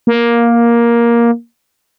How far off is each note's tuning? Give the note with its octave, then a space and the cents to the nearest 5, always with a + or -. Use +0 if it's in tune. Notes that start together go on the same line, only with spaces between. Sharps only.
A#3 +10